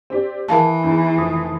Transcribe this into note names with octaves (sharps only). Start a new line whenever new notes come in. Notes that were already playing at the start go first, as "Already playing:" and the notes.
C4 G4 D5
E3 G#4 A#4 F5 A5
E2 D#4 G#4
F1 F3 D#6